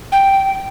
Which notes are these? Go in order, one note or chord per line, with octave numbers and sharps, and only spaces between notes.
G5